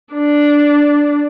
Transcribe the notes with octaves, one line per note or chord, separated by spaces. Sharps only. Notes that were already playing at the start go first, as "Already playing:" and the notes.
D4